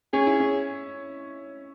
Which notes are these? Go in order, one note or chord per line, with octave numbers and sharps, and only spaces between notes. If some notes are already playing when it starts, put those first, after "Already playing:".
C#4 G#4
E4
C#4